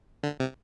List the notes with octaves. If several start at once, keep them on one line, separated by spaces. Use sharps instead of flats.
D3
C3